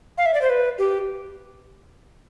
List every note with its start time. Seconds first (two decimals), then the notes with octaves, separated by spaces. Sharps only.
0.18 F5
0.26 E5
0.34 D5
0.42 C5
0.50 B4
0.78 G4